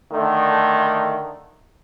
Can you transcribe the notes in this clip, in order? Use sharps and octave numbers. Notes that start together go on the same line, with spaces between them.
D3 D#3 A3